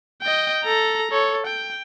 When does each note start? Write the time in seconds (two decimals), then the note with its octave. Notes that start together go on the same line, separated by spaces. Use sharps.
0.22 D#5 G5
0.64 A4 A#5
1.11 A4 C#5
1.47 G5